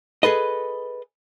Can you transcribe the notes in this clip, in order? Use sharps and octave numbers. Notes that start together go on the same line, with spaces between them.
G#4 A4 B4 D#5